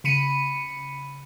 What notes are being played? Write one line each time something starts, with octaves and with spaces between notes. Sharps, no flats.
C#3 B5 C#7 D#7